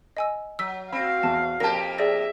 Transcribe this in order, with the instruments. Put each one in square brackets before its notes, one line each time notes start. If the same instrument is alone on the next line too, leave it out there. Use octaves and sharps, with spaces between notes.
[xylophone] D#5 G#5 E6
[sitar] F#3 [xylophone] E6 B6
[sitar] C4 [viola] F#4 F5 [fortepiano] B5
[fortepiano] E2 [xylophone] A5
[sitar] F2 A#3 G4 [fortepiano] A#4 A5 [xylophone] A#6
[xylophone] G#4 D5 A#6 [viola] E5